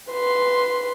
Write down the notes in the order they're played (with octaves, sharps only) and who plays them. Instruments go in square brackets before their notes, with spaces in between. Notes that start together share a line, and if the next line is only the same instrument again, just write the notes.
[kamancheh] B4 C6